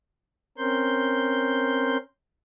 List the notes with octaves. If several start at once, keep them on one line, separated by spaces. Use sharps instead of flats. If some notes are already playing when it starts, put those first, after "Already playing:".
C4 C#4 A#4 C6 G6